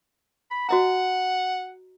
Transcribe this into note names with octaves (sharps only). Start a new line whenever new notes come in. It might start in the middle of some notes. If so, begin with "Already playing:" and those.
B5
F#4 D#5 F#5 A#5